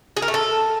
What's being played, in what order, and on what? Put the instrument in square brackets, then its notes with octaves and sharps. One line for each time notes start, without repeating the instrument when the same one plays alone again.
[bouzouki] G#4
A#4
A3
A4